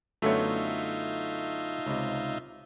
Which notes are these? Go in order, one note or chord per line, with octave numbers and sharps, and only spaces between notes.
F#2 D3 A3 B3 D#4 F4 C#5 E5
C#2 C3